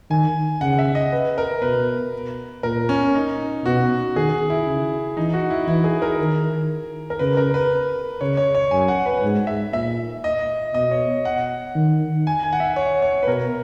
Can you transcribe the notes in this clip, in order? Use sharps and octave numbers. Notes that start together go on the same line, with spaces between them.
D#3 G#5
C#3 F#5
E5
D#5
B4
A#4
B2 B4
A#2 A#4
C#4
D#4
B2 F#4
D#3 G#4
E4
C#3
E3 D#4
F#4
E4
E3 E4
G#4
A#4
D#3
A#4
C#3 B4
A#4
B4
C#3 C#5
C#5
C#5
F#2 G#5
F#5
B4
G#2
E5
A#2 E5
D#5
B2 D#5
C#5
F#5
D#3
G#5
G#5
F#5
E5
C#5
C#5
B4
B2 A#4